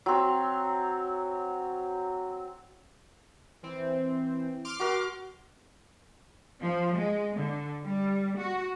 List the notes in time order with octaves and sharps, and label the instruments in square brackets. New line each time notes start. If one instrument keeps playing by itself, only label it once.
[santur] F#3 C4
[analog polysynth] E3 C4
C6 D6 F6
[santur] F#4 A#4
[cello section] F3
G#3
D3
G3
F#4